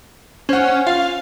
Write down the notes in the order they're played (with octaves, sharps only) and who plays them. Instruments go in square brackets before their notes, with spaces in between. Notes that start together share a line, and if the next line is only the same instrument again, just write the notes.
[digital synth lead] C#4 [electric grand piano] C5 F#5
[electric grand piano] F4 [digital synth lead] F5